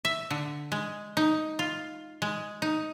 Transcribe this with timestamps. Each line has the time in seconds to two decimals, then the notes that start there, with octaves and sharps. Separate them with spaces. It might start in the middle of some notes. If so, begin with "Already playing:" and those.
0.05 E5
0.30 D3
0.72 G#3
1.17 D#4
1.59 F4
2.22 G#3
2.62 D#4